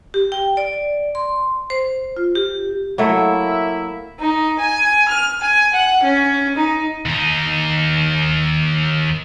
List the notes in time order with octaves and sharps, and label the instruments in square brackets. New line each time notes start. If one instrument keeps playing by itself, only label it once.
[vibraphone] G4
G5
D5
C6
C5
F4
G4
[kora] F#3 A3 [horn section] A#3 E4 E5
[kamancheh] D#4
G#5
F6
G#5
F#5
C#4
D#4
[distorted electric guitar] D#2 D#4